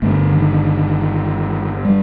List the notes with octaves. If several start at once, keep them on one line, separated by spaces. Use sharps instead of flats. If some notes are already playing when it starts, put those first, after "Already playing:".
G1 G2 D3 A3
D#3
G3